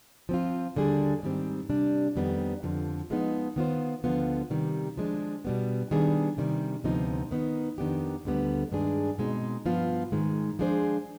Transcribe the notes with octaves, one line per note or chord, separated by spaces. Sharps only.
F3 C4 F4
D#2 D3 G3 D4 G#4
G#2 D#3 G3 C4
C3 G3 D4
F2 D#3 G3 B3
F2 D3 F3
F3 G#3 B3 D#4
D#3 B3 F4 C5
D2 D3 F3 B3 F4
C3 D#3 G3
F3 G#3 D4
B2 G3 B3
D#3 G3 B3 D4 G#4
C3 D#3 G3
D2 C3 F3 B3 D#4
D#3 B3 D#4
F2 D#3 B3 D4 G4
D2 D3 G3 B3
G2 D#3 G#3 D4 G#4
B2 G#3 C4 D#4
G2 F3 B3 F4
G#2 D#3 G#3
F3 G#3 D4 G#4 C5